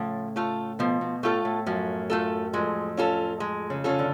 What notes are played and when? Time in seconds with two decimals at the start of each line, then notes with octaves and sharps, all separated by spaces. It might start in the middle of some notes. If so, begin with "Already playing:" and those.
Already playing: A2 C#3 F3
0.36 A3 F4 A4
0.79 B2 F3
1.01 B2
1.23 A2 A3 F4 A4
1.45 A2
1.66 F#2 F3
2.10 A3 F4 A4
2.53 F2 G#3
2.97 C#4 F4 A4
3.40 G#3
3.70 C#3
3.84 C#3 C#4 F4 A4
3.99 D3